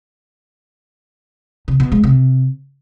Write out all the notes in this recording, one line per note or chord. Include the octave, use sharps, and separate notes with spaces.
C3
B2
G#3
C3